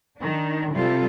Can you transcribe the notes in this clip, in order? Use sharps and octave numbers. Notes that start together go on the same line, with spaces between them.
D#3 D4
C3 G3 F4 A4